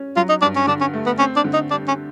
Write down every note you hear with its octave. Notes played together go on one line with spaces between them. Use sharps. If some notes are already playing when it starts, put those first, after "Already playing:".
Already playing: C#4
F#3 F4
D#4
G2 D4
C#4
D3 D4
C#4
A3
B3
C4 C#4
D4
D3
D#4
G3 D4
C#4